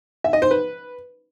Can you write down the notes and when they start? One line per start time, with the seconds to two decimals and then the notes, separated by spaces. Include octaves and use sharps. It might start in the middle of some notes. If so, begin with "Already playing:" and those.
0.24 E5
0.33 D#5
0.42 C5
0.51 B4